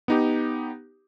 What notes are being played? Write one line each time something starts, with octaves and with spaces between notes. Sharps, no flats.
B3 D#4 G4